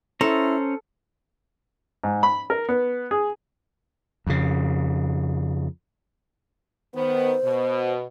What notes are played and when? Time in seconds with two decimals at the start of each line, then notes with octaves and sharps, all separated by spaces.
0.21 C#4 E4 A4 C5 A#5
2.04 G#2
2.23 B5
2.50 A#4
2.69 B3
3.11 G#4
4.27 F2 C#3
6.95 D#3 B3 C5
7.44 B2